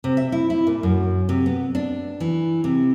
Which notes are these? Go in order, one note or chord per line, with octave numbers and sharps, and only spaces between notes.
C3
E5
E4
E4
A#2
F#2
C3
B3
D4
E3
C3